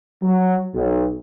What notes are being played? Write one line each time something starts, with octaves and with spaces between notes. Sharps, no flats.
F#3
B1